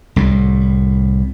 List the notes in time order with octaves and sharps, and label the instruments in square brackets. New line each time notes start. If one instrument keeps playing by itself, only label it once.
[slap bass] C2 A2